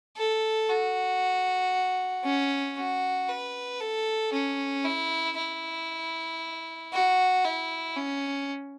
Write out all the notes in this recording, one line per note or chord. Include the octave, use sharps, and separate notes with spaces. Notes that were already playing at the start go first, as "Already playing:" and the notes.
A4
F#4
C#4
F#4
B4
A4
C#4
E4
E4
F#4
E4
C#4